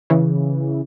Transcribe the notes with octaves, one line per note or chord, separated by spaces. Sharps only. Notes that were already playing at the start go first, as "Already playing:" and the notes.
C#3 E3